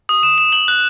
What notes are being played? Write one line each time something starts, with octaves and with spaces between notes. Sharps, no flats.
D#6
E7
E7
F#7
F#6